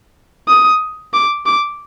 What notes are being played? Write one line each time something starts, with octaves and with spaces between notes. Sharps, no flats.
D#6
D6
D6